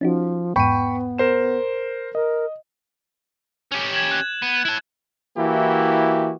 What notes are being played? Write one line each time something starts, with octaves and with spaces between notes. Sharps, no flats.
F3 C#4 D#4 F#4
E2 G#2 B3 G5 B5 C#6 D#7
A#4 C5 E7
A#4 D#5
C#4 G4
G#6 E7 F#7
F#6
B3
E4 A5
E3 A#3 E4 F#4 G4